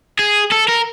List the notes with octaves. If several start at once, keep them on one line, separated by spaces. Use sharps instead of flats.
G#4
A4
A#4